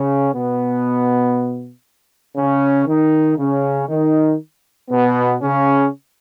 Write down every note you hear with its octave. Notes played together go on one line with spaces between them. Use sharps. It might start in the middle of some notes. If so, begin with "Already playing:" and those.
Already playing: C#3 C#4
B2 B3
C#3 C#4
D#3 D#4
C#3 C#4
D#3 D#4
B2 B3
C#3 C#4